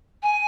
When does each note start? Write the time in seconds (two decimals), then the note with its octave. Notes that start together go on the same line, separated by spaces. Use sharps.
0.23 G#5